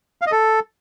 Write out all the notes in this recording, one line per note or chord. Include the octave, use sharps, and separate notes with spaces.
F5
D#5
A4